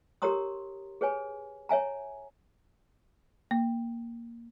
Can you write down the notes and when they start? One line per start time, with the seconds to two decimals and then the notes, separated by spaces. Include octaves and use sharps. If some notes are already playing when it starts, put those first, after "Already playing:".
0.22 G4 A#4 C#5 A#5 C6 D#6
1.01 G#4 B4 C#5 G#5
1.69 C#5 E5 G#5 A#5
3.51 A#3